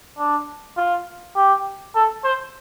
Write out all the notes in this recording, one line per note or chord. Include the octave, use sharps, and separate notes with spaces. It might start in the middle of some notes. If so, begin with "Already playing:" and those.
D4
F4
G4
A4
C5